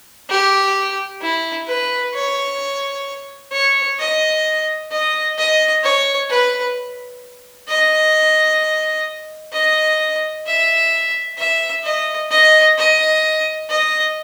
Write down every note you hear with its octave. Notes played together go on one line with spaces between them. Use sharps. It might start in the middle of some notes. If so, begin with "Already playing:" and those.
G4
E4
B4
C#5
C#5
D#5
D#5
D#5
C#5
B4
D#5
D#5
E5
E5
D#5
D#5
D#5
D#5